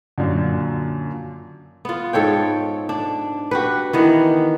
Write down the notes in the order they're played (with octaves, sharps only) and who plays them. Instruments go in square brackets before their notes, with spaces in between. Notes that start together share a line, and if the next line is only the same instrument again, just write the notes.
[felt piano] F#2 A#2 D3
[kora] B3 F4
G#2 A4 C#5 G5
D4
F#4 G4 B4
D#3 E3 B3